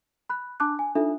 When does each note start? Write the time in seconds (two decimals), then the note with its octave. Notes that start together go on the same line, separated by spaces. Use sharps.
0.30 B5 F#6
0.60 D4 A5 D6 F#6
0.79 G#5
0.95 D4 D#4 F4 A4 E5